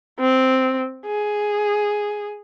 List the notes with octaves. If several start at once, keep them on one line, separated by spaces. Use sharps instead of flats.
C4
G#4